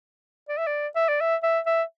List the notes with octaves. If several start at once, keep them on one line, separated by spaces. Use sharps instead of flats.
D5
E5
D5
E5
D5
E5
E5
E5